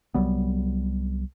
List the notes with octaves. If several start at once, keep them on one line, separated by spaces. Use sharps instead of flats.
C2 F#3 G3 B3